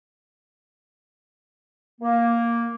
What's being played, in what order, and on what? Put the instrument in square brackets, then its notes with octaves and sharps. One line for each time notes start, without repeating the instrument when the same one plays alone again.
[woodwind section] A#3